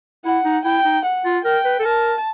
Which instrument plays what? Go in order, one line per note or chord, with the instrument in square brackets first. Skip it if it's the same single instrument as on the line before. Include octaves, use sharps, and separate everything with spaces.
[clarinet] E4 [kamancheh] F#5
[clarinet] D#4
[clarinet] E4 [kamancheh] G5
[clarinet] D#4
[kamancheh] F#5
[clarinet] F4
[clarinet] A#4 [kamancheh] G5
[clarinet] B4
A4
[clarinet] A#4 [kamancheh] A5